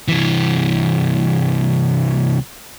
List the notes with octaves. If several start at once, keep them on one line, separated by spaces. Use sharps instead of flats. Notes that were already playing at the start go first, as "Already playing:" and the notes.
C2 E3